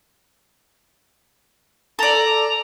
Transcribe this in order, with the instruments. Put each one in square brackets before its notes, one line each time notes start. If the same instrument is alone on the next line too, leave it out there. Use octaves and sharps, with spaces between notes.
[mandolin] A4 D5 [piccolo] A#5